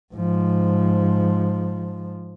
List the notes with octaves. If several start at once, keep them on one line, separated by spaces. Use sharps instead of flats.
G#2 F3